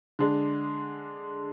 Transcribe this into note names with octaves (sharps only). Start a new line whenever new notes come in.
D3 G#3 D4